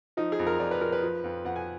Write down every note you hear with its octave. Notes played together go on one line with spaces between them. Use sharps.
F3 D#4
G#4
F2
A#4
F2 D5
B4
F3 A#4
B4
F3
F2
F2 F#5
G#5